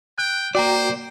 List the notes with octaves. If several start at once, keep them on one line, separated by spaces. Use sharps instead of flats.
G5 F#6
A#3 F#4 C5 D5 G5 A#5